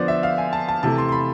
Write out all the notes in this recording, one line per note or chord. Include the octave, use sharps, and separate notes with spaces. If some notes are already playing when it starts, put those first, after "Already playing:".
Already playing: D3 F3 B3 C5 D5
E5
F5
G#5
A5
A5
C3 E3 A3 A5
C6
C6
B5